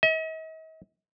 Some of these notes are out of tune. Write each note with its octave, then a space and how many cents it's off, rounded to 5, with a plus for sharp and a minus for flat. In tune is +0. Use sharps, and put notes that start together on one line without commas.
D#5 +45